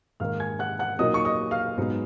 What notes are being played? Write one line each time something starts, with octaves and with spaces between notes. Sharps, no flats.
G#2 D#3 A#3 F5 F6
G#5 G#6
F#5 F#6
F#5 F#6
A#2 F#3 A#3 D#4 D#5 D#6
C#6
D#5 D#6
F5 F6
G#2 F#3 B3 D#4